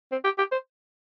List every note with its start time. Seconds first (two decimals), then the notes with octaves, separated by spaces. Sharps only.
0.12 C4
0.24 G4
0.38 G4
0.52 C5